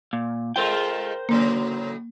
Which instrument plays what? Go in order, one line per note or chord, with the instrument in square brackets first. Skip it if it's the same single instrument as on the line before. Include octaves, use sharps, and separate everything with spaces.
[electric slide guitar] A#2
[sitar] G#3 A3 F4 [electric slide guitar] A#4 C5 G5
[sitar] A2 C#3 F#3 [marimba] A#3